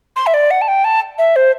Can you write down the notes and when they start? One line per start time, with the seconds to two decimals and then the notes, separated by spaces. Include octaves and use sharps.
0.16 C6
0.26 E5
0.34 D5
0.51 F#5
0.61 A5
0.68 G5
0.84 A5
1.18 E5
1.36 C5